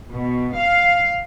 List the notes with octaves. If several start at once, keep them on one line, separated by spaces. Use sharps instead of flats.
B2
F5